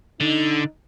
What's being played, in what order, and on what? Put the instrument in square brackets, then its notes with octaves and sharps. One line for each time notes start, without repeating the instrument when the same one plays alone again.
[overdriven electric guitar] D3 [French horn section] D#4